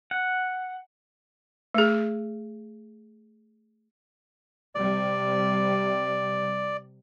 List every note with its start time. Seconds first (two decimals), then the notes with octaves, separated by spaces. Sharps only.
0.11 F#5
1.75 A3 G#4
4.75 C3 G3 D5